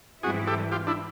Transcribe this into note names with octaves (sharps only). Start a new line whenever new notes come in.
G#2 E3 G3 C4 E4 F#4 G#4
G4 A4
F4 G4
D4 E4